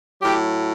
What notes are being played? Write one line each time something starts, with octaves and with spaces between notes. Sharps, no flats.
A2 F#3 G4